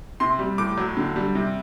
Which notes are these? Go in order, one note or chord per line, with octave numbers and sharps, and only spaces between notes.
C3 C6
G3
A2 D6
F#3
D3
G3
C3